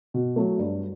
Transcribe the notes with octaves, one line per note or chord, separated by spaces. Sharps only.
B2
F#3 A3
G2